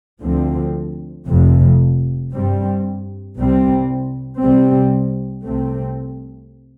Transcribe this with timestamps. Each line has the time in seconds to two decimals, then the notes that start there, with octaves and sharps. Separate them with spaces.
0.23 D2 D3 F3 C4
1.28 F1 F2 C3
2.32 G2 G3 C4
3.36 C2 C3 G3 C4
4.41 C2 C3 G3 C4
5.45 C2 C3 A3 C4